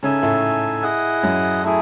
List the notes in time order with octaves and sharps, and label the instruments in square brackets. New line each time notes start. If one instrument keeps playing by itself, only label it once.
[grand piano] C#3 C#4 [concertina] D#4 A4 E5 G#5
[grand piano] A2 A3
[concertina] E4 G#4 D#5 F#5
[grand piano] F#2 F#3
[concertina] A3 E4 G#4